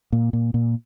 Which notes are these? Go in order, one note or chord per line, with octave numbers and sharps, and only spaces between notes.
A#2
A#2
A#2